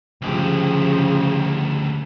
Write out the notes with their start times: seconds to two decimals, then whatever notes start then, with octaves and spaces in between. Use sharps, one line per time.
0.22 D2 C#3 F3 G4